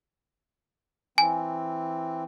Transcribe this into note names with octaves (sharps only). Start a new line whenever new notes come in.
E3 C4 G#5